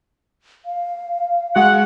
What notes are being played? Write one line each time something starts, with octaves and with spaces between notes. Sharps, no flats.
F5
G#3 F#4 F#5